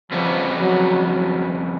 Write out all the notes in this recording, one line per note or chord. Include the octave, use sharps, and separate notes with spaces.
F2 C#3 F3 G3 B3
F#3
F#3